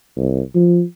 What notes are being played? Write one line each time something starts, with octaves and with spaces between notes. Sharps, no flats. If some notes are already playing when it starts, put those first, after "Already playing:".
C2
F3